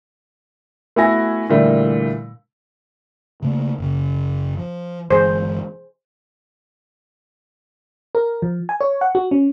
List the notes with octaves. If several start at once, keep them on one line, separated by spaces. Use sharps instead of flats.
A3 B3 E4 F#4 G#5 A#6
A#2 D3 E3 G3 A3
C#3 A3 A#3
F#1 C#3
F3
G1 E3 G#3 G#4 C5
A#4
F3
G#5
C#5
F#5
F#4
C#4